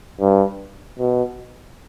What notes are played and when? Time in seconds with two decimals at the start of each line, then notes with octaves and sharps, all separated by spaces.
0.21 G2
0.99 B2